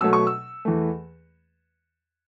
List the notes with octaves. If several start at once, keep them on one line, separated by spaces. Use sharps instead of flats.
B2 F#3 A3 E6
C#6
E6
E2 E3 A3